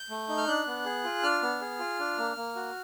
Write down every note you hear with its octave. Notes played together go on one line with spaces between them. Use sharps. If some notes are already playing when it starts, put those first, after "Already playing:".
Already playing: G6
A3
D#4
F6
D4 F#6
B3
G#4
F4
D4 F6
B3
G#4
F4
D4
A#3
A#3
F#4